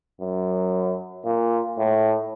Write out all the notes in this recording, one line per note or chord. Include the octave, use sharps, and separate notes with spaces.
F#2
A#2
A2